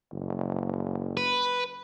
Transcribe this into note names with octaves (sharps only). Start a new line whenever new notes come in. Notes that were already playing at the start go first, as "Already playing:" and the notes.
F#1
B4